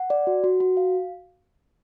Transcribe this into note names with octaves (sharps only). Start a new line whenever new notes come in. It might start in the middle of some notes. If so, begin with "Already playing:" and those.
Already playing: F#5
D5
F#4
F#4
F#4
F5